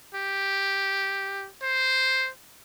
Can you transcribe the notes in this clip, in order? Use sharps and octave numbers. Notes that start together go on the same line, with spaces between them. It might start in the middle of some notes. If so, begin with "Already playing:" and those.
G4
C5